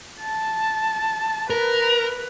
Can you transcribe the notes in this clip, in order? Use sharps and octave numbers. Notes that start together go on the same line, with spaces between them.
A5
A#4 B4